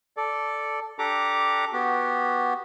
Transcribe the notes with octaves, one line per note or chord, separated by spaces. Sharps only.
A4 D5
D4 G4 A4 A#5 D6
B3 F#4 G4